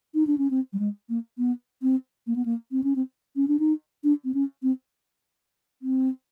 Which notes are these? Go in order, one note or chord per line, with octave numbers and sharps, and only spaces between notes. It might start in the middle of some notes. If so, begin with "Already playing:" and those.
D#4
D4
C#4
C4
G3
G#3
A#3
B3
C4
A#3
B3
A#3
C4
C#4
C4
C#4
D4
D#4
D4
C4
C#4
C4
C4